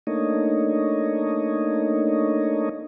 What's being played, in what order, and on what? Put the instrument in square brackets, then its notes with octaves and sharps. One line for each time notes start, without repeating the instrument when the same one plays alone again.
[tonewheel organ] A3 A#3 D4 D#4 C#5 D#5